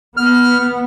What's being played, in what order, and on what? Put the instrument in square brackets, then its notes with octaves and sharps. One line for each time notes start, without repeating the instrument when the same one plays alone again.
[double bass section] B3 [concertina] F6